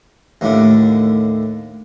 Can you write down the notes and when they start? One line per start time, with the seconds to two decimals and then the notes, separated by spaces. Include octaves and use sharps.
0.41 D#2 A2 D3